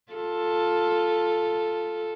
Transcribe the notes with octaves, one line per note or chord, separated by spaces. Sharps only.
F4 A4